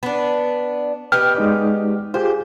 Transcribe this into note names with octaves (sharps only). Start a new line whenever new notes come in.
B3 D4
B3 G4 D#5 G5 F6
G#3 D#4 D5
F4 G4 G#4 C5